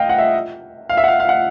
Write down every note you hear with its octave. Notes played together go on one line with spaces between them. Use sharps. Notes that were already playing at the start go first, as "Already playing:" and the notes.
Already playing: D#5 F5 G5
F#5
E5
F5
E5
F#5
F5
F5
F#5